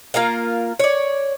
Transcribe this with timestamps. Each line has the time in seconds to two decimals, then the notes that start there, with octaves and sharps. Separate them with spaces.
0.14 A#3 F4 A#4 F5
0.80 C#5 D5